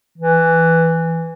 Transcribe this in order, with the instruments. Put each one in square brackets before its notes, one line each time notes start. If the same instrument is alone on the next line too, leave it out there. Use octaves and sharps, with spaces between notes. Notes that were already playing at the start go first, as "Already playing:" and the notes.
[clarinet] E3